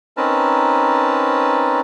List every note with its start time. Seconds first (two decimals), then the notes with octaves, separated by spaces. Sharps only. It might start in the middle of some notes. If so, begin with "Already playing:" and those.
0.17 C4 C#4 D#4 A#4 B4 A5